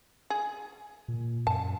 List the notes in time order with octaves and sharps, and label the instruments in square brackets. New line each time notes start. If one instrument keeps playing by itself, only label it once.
[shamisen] G#4
[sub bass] A#2
[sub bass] F#2 [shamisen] A5